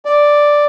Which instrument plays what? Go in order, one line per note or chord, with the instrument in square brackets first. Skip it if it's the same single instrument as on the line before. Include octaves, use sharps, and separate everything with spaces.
[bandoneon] D5